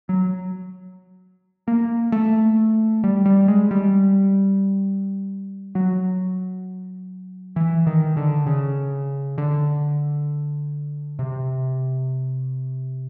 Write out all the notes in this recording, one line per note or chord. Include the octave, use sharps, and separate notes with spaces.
F#3
A#3
A3
G3
G3
G#3
G3
F#3
E3
D#3
D3
C#3
D3
C3